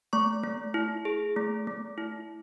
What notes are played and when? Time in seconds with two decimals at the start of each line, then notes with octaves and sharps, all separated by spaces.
0.13 A3 C#6
0.43 A3
0.74 E4
1.05 G#4
1.36 A3
1.67 A3
1.98 E4